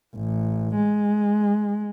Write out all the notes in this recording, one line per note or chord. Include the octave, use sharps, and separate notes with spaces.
A1
G#3